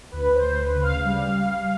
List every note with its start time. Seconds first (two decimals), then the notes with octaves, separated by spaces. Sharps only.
0.11 D2 B4
0.35 C5
0.43 D2
0.59 B4
0.75 C#3
0.82 F5
1.05 G3 F5